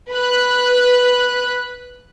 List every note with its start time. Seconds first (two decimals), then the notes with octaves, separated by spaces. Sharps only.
0.10 B4 B5 F#6